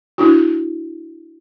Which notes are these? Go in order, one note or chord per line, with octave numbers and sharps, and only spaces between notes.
D4 E4 F#4